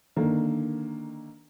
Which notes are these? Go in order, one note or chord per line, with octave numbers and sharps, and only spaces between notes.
D3 D#3 A#3